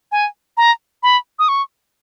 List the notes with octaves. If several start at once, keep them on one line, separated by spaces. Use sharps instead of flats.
G#5
A#5
B5
D#6
C#6